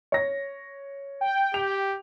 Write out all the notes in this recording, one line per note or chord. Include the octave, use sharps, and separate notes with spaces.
C#5 A#6
G5
G4 F7